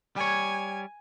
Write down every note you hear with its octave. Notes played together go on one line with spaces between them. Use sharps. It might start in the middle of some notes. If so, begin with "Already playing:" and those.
G3 C#5 G#5